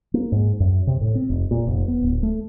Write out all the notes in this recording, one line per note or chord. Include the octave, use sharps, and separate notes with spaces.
A#3
G#2
F#2
C3
A2
C4
F1
A#2
F1
B3
D1
A3